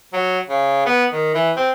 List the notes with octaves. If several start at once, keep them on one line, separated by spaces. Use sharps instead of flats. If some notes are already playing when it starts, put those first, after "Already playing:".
F#3
C#3
B3
D#3
E3
C4